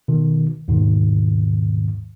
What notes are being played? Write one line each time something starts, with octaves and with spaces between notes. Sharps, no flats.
B2 D#3
D#2 G#2 B2 D#3